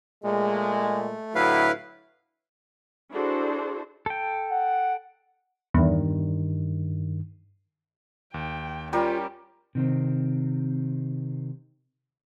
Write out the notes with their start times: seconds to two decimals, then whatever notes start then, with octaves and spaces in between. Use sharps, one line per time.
0.24 A#2 G#3 A3
1.35 A2 D3 F#3 E4 B4 F5
3.11 D4 E4 F#4 G#4 A4 C5
4.06 A4 G5
4.51 F#5
5.74 E2 G2 D#3
8.34 D#2 G5
8.93 G3 C#4 F4 G4 A#4 G5
9.75 C3 D#3 C4